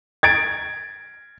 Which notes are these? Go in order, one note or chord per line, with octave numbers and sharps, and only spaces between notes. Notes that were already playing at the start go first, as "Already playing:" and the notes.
G#6 A6 D7